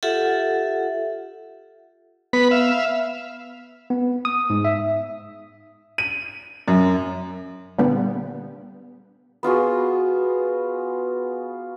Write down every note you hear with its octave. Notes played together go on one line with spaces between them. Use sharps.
F4 G4 A4 E5 F#5
B3 B4 B5
E5 F5
B3
D#6
G#2
E5
D#7
F#2
A#2 D3 G3 B3
B3 F4 F#4 G#4